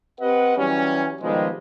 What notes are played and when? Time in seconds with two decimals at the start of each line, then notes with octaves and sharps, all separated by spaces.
0.20 C4 G4 B4 D#5 F#5
0.57 E3 F#3 G3 C#4
1.21 B2 D#3 F3 G3 G#3